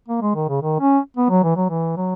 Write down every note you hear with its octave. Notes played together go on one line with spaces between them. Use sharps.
A#3
G#3
D#3
C#3
D#3
C#4
B3
F#3
E3
F#3
E3
F#3